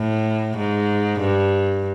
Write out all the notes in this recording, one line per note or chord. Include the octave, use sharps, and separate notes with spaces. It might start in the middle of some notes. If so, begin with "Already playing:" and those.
Already playing: A2
G#2
G2